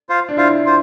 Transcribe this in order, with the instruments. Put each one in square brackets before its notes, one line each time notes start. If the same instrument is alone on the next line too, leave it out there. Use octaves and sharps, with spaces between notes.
[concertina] F4 C5 F5
[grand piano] D4
[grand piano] E4 [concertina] F4 C5 F5
[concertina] F4 C5